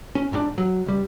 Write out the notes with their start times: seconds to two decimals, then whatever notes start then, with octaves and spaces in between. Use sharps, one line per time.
0.15 C#4
0.32 G#1 G#2 C#3 D4
0.58 F#3
0.86 C#2 G3